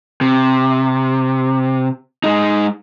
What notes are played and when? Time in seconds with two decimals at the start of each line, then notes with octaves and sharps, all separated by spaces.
0.21 C3
2.24 G#3 D#4